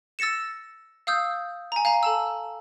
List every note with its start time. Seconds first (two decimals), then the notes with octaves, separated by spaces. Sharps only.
0.19 E6 A6 A#6 C#7 E7
1.07 F5 D#6 E6 G6
1.72 G#5 A#5
1.85 F5 G#5 A#5
2.03 A4 A5 E6